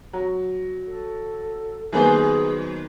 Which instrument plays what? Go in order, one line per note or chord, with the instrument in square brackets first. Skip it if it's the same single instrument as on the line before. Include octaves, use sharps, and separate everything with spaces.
[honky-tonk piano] F#3
[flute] A4
[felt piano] D#3 B3 [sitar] F#3 B4 C5 [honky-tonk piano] A#3 [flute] G#4